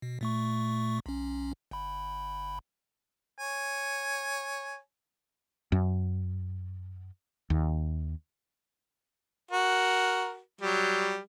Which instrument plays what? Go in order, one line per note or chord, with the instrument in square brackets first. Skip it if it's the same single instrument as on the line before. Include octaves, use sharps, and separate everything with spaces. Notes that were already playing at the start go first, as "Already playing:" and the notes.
[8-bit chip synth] B2
A#2 A3 C#6
B1 C#4
G1 B5
[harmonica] C#5 G#5
[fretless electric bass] F#2
D#2
[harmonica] F#4 A#4
F#3 G3